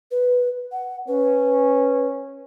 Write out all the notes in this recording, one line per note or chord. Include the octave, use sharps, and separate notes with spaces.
B4
F#5
C#4 B4